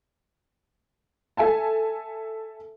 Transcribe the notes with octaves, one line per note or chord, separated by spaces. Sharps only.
A4 E5 G#5 A5